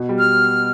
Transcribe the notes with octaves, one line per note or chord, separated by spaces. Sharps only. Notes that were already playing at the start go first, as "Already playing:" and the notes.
Already playing: B2
G3
F6